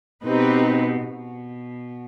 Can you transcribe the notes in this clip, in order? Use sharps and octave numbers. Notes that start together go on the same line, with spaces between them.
B2 C4 D#4 G4 B4
B2